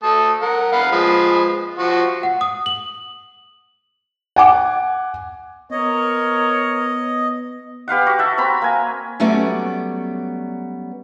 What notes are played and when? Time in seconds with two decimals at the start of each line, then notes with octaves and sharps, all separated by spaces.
0.03 A3 A5 D#6
0.42 A#4 F#5
0.73 F5 F#5 B5
0.92 F3 G#3 B4
1.79 F3 F#4
2.23 F#5
2.41 D#6
2.66 F#7
4.36 F#5 G#5 D6
5.71 B3 A#4 C#5 D#5
7.88 G4 B4 F5 F#5
8.07 F#4
8.19 A4 E5 F#5
8.38 C4 A#5 B5
8.62 A#3 G#5
9.20 F#3 G3 A3 B3 C#4 D5